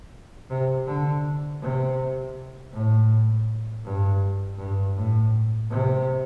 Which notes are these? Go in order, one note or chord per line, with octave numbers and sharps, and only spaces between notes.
C3
D3
C3
A2
G2
G2
A2
C3